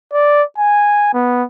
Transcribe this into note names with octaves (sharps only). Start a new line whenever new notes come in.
D5
G#5
B3